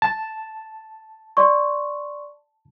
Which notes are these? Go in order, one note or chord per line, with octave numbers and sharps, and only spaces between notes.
A5
D5 C6 C#6